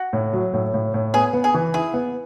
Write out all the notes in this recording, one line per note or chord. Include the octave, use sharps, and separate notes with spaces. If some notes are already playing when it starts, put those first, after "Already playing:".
Already playing: F#4
A2
F#3
A2
A2
A2
B3 G#4
B3
G#4
E3
E4 G#4
B3